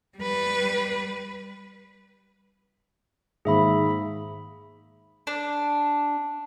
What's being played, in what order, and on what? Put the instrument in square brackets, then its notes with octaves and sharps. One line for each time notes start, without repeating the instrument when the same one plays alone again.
[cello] G3 B4
[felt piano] G#2 D#3 A#3 [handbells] G#4 E5 B5
[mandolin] D4